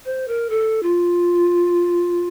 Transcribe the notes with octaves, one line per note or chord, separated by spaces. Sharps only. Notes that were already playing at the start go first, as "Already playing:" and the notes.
C5
A#4
A4
F4